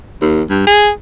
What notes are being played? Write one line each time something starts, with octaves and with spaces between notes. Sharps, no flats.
D#2
G2
G#4